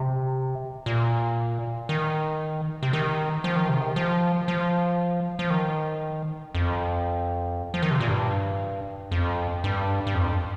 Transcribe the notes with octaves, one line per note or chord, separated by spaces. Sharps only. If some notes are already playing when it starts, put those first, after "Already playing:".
Already playing: C3
A#2
D#3
C3
D#3
F3
D#3
C3
D#3
F3
F3
F3
D#3
F2
F3
D#3
C3
A#2
G2
F2
G2
G2
F2